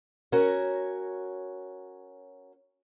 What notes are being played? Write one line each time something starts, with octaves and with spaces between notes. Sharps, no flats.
C#4 F#4 A#4 C#5